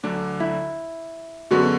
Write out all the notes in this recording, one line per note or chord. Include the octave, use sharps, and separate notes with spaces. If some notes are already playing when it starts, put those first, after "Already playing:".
D2 D3 F#3 D4
E4
F#2 D3 G#3 B3 F#4